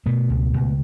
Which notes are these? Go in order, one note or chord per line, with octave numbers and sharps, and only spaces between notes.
B2 A3 B3
C#2
C#2